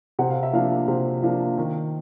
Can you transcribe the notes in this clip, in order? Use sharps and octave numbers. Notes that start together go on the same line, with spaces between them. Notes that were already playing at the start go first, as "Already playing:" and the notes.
C3 F#5
F5
E5
F3 A#3 D4 F5
C3
F3 A#3 D4
D#3